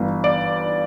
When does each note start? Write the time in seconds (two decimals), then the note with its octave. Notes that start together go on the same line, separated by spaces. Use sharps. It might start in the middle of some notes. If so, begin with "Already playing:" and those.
Already playing: G1 E3
0.24 D5